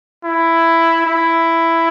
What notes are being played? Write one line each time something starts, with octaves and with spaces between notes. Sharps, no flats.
E4
E4